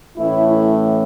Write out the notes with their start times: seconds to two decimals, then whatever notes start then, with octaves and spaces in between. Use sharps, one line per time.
0.17 A2 E3 A3 C#4 E4
0.48 E4